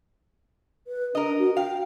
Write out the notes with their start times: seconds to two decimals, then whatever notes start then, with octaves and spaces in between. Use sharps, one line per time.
0.87 B4
1.15 D4 A#4 D#5
1.39 F#4
1.57 F5 G5